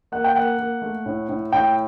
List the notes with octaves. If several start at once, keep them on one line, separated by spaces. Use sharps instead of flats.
A#3 F#5
G5
A#3 F#5
A#3
A3
A2
A2
A2 G5